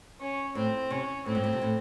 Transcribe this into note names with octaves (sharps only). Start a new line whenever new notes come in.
C#4
A2 C4
C3 C#4
A2 C4
G#2
A2
C3
A2